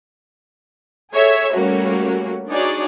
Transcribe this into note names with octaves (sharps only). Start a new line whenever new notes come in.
G#4 A4 C#5 E5
G3 A3 A#3 C#4 F#4
D4 D#4 F#4 G#4 C#5 D5